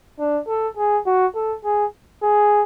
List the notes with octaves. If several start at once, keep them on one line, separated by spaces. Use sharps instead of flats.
D4
A4
G#4
F#4
A4
G#4
G#4